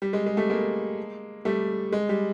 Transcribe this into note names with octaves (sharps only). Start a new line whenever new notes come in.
G3
G#3
G#3
G3 A3
G#3 A#3
G3 A3
G#3
G3